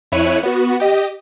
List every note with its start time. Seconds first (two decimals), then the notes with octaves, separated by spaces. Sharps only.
0.12 F2 E4 C#5 F#6 D#7
0.43 B3 F#4
0.80 G4 D#5